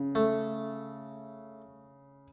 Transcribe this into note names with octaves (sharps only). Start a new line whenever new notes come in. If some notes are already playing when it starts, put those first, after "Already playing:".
Already playing: C#3
A3